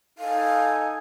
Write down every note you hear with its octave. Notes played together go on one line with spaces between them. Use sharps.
D#4 A4 F5 G#5